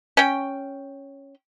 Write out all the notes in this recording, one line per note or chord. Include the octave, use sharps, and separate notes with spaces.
C#4 G5